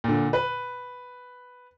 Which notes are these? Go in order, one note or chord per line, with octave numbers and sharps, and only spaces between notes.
A#2 D3
B4